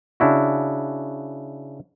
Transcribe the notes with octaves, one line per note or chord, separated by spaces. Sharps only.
C#3 D4 E4 F#4